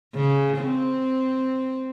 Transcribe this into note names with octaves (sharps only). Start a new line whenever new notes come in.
C#3
C4